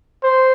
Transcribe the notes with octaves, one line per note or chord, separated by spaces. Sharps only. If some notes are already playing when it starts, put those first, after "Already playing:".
C5